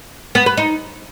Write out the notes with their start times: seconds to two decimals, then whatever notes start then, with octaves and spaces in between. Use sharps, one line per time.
0.35 B3
0.46 B4
0.57 D#4